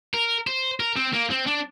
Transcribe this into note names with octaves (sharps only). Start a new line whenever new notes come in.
A#4
C5
A#4
C4
A#3
C4
D4